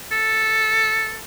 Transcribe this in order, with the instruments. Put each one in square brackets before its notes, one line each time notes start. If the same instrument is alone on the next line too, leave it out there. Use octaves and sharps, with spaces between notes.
[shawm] A4